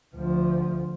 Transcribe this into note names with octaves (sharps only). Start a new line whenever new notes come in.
D2 F3